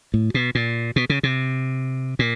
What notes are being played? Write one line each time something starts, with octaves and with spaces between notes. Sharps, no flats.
A2
B2
A#2
B2
C#3
C3
A#2